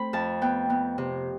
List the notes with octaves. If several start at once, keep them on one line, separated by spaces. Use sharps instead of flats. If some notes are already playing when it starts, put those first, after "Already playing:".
Already playing: A3 C4 B5
F2 A5
B3 G5
B3
C3